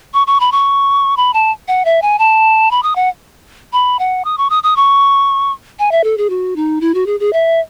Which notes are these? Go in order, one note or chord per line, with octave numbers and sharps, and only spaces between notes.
C#6
C#6
B5
C#6
B5
A5
F#5
E5
G#5
A5
B5
D#6
F#5
B5
F#5
D#6
C#6
D#6
D#6
C#6
G#5
E5
A4
G#4
F#4
D#4
E4
F#4
G#4
G#4
E5